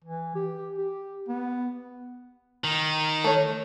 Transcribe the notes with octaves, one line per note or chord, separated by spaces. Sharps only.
E3
G4
G4
B3
D#3
A3 C#5